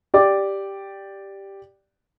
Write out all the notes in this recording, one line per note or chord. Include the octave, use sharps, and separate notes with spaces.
G4 D5 D6